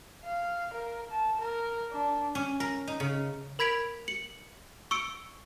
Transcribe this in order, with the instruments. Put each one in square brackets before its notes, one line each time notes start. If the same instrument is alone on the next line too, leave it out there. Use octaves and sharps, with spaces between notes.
[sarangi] F5
A#4
A5
A#4
D4
[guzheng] C#4
A#4
D#4
C#3
[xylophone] A#4 B5 G#6 B6 D7 F7
C#7 F#7
C#6 E6 C#7 D7